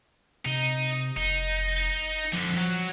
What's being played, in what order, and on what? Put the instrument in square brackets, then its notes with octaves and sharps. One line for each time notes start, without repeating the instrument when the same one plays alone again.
[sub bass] C3 [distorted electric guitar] D#4
[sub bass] F1 [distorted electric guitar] D#4
[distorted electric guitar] F2 D3 [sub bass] F3
[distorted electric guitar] F#3